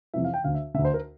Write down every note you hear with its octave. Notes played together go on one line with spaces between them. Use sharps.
F2 C3 E3 E5
F5
G5
D2 D3 F5
E5
D2 D3 E5
C5
A#4